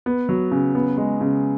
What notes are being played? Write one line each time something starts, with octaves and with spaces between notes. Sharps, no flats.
B3
F#3
C#3
B3
G#3
C#3